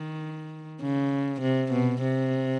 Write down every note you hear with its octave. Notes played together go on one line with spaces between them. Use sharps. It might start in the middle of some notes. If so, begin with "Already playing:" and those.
Already playing: D#3
C#3
C3
B2
C3